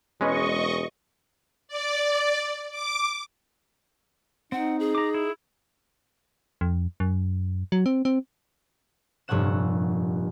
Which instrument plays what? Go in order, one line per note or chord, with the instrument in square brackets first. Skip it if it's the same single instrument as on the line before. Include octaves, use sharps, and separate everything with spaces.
[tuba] E1 [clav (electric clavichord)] G#3 C#4 B4 [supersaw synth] D#5 C#6
[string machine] D5
D6
[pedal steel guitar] C4 [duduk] D#4 [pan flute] F#5
[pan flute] G#4
[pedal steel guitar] A#5 D6
E4
[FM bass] F2
F#2
F#3
C4
C4
[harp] F1 G2 A#2 C#5 F#5 E7